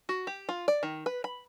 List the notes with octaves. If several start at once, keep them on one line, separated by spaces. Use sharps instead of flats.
F#4
G4
F4
D5
D#3
B4
B5